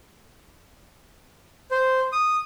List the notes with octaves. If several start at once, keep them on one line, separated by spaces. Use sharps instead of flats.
C5
D#6